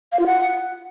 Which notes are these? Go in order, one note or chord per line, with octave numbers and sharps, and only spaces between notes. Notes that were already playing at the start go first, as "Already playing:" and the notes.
F5
F4
F#5